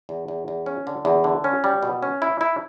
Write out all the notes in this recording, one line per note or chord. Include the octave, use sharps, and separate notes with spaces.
E2
E2
E2
C#4
D3
E2
D3
C#4
G3
B2
C#4
E4
E4